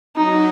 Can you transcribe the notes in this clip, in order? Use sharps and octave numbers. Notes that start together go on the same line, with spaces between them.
F#3 D#4